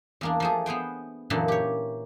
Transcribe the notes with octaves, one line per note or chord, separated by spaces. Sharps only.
E2 A#3 D4
F3 A3 G#4
B3 G#4 C5 G5
F#2 A#2 D3 E3 A#3
G4 C#5